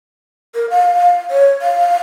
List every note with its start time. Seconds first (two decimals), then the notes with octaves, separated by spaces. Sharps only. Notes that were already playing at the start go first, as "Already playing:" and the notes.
0.55 A#4
0.70 F5
1.30 C#5
1.62 F5